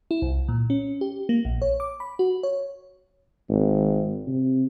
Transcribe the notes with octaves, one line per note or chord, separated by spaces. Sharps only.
E4
C2
A#2
C#4
G4
A#3
A#1
C#5
D6
B5
F#4
C#5
G#1
C3